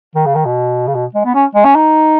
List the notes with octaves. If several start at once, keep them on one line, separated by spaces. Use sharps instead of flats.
D#3
C#3
D#3
B2
C#3
B2
G#3
B3
C#4
G#3
C#4
D#4